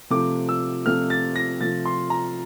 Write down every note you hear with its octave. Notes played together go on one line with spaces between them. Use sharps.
C3 F3 A3 D6
E6
C3 F3 A3 F6
A6
A#6
C3 F3 A3 A6
C6
A#5